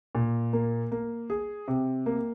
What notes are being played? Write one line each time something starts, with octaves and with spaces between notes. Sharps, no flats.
A#2
A#3
A#3
G#4
C3
A#3